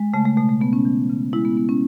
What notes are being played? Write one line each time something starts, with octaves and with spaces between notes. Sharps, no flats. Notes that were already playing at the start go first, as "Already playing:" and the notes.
Already playing: G#3
C#3 A3
A3
B2 A3
A3
B2 B3
C#4
E3
C#3
G#3 E4
B3
B2 B3
C#4